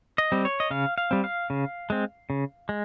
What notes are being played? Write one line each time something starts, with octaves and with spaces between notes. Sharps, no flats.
D#5
G3 C4
C#5
D#5
C#3 F5
F5
G3 C4
F5
C#3
G#3 C4
C#3
G#3